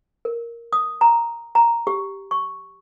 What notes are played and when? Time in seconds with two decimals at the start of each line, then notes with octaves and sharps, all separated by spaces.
0.25 A#4
0.73 D#6
1.01 A#5
1.55 A#5
1.87 G4
2.31 C#6